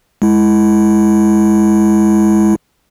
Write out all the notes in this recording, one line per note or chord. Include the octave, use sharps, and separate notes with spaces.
G#3 E4